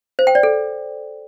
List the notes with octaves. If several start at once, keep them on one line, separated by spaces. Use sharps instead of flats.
C5
G5
D5
A4